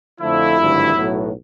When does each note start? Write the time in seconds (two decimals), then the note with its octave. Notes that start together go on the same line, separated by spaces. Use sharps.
0.20 F2 D3 F3 A3 E4
0.57 G#1 G2 D3 F3 A3
0.95 B1 A2 F#3 B3